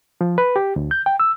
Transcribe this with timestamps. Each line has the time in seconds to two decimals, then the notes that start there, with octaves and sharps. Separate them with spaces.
0.21 F3
0.38 B4
0.56 G4
0.76 D2
0.91 G6
1.06 G5
1.20 E6